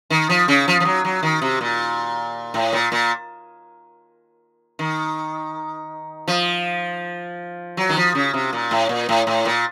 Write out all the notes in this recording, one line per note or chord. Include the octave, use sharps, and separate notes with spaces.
D#3
F3
C#3
F3
F3
F#3
F#3
D#3
C3
A#2
A2
A#2
A#2
D#3
F3
F#3
D#3
F3
C#3
C3
A#2
A2
A#2
A2
A2
A#2